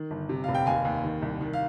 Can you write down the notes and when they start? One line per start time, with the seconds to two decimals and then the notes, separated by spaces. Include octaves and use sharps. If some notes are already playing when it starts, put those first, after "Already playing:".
Already playing: D#3
0.11 G1
0.29 C3
0.44 F1 F5
0.54 G5
0.66 D#2 F5 G#5
0.85 D#2
1.04 D#3
1.22 C2
1.41 D#3
1.53 F5